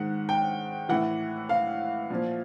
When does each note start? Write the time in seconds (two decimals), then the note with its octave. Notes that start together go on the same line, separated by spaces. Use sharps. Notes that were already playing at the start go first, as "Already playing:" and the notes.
Already playing: G#2 D#3 F#5
0.29 G5
0.89 A2 E3 F#5
1.49 F5
2.10 A#2 F3